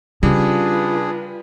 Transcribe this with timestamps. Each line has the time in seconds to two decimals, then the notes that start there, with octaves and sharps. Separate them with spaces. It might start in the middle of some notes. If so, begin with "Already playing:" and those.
0.23 C#3 G3 D4 F4 G#4 B4